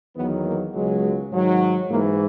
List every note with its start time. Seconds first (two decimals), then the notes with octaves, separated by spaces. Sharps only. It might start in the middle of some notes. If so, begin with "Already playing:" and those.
0.16 E2 D#3 F#3 B3
0.46 A#3
0.75 C#2 B2 F#3 G#3
1.32 G#2 D#3 F#3
1.90 G#2 E3 A#3